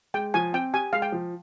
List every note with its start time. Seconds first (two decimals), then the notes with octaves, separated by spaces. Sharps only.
0.14 G#3 G5
0.34 F3 G#5
0.53 C4 G5
0.73 G4 G#5
0.93 G#3 F5
1.02 G5
1.12 F3